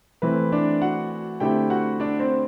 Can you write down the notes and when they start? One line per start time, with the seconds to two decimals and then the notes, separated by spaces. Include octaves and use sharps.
0.22 E3 A3 C4 E4 B4
0.52 D4 D5
0.82 F#4 F#5
1.40 D3 A3 C4 E4 G4 G5
1.70 F#4 F#5
2.00 D4 D5
2.20 C4 C5